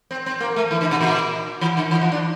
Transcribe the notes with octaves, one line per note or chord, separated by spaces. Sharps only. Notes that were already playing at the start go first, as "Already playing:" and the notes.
C4
C4
A#3
A3
E3
D3
C3
A#2
E3
D3
E3
F3
D4